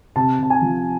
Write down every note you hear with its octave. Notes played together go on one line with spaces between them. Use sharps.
C3 A5
C3 A5
G#5
F3